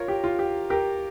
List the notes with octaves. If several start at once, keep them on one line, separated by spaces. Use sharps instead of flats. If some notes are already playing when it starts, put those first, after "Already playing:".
Already playing: F4 A#4 C#5
G4
F4
G4
G4 A#4